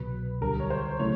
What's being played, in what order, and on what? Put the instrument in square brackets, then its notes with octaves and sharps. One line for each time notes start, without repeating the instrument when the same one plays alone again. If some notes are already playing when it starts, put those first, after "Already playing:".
Already playing: [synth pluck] C2 B2 F#3 [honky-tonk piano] B4
[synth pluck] D2 D3 G3 [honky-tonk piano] A#4
[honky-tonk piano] C#5
C5
[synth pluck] C#3 F#3 A3 C#4 E4 [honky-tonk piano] C#5